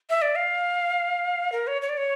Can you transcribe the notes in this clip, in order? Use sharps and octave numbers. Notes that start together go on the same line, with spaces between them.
E5
D5
F5
A#4
C#5
C#5
D5
C#5